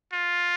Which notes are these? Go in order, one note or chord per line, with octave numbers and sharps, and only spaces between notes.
F4